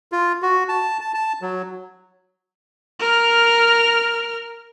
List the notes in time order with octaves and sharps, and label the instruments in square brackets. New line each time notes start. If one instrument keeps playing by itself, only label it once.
[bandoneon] F4
F#4
A5
A5
A5
F#3
[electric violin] A#4 F6